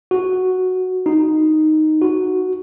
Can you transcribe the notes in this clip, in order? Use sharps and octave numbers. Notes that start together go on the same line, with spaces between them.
F#4
D#4
F#4